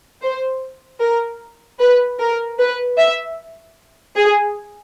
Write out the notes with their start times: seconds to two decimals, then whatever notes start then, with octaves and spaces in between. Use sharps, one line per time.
0.22 C5
1.00 A#4
1.79 B4
2.19 A#4
2.59 B4
2.98 E5
4.16 G#4